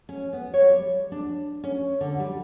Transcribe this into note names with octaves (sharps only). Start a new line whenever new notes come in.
C#4
B3
C#5
G3
D4
C#4
D3
G3